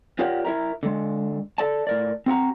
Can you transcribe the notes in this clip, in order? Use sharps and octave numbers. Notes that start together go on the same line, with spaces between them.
F4 G4 A#4 C#5 D5 F#5
E4 A#4 E5 A#5
D3 G#3
A4 D5 A5
A2 A#4 D5
C4 F#4 F#5 A#5